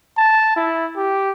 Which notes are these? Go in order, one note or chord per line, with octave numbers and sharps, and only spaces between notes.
A5
E4
G4